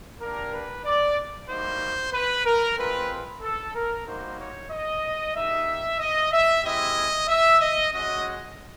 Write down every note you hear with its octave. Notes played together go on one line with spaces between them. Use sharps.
A#3 D4 G4 A#4
B4
D5
G3 A#3 D#4 F#4 C5
B4
A#4
G#3 C4 F4 B4
A4
A#4
G3 A#3 D#4 F#4 C5
C#5
D#5
A#3 D#4 G4 E5
D#5
E5
G#3 C4 E4 G4 D#5
E5
D#5
G#3 C#4 F#4 D#5